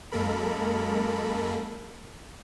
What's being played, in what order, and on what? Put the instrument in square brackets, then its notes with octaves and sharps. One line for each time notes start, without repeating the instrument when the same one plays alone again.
[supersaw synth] F#2 G#3 A#3 A4 A#4 B5